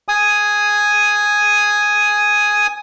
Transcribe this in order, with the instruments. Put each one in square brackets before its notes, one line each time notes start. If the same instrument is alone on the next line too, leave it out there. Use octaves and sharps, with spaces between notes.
[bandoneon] G#5 D#6